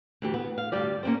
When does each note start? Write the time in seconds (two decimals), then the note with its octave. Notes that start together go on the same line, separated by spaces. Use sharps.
0.22 D2 E3 G4
0.34 B3
0.58 F5
0.72 D2 G2 G3 G4 D5
1.03 A#3 C#4 D4 G4 C5